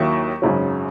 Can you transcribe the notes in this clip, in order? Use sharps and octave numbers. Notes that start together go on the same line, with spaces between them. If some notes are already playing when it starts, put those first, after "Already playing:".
Already playing: D#2 D#3 F#3 A#3 E4 C#6
G#1 F#2 C#3 F#3